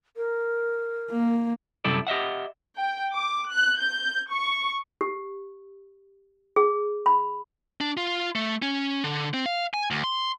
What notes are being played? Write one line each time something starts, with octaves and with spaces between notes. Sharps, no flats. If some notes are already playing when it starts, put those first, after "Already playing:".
A#4
A#3
F#2 C3 G3 E4 A4 D5
G4 D#5 E5 F#5
G5
D6
F#6
G6
C#6
G4
G#4
B5
D4
F4
A3
C#4
D3
C4
F5
G#5
D2
C6